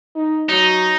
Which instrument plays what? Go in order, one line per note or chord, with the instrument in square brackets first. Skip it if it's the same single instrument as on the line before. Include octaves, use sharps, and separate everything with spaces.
[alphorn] D#4
[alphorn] F#3 [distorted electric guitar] D#4